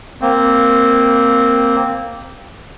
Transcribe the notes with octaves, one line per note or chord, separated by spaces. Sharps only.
A#3 C4